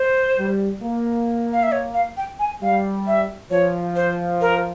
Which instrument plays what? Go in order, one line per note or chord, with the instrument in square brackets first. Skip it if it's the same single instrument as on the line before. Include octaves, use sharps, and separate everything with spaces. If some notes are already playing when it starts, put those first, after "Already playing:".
Already playing: [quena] C5
[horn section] G3
A#3
[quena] F5
E5
C#5
F5
G5
G#5
[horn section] G3 [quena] F5
[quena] E5
[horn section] F3 [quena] C#5
[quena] C5
A#4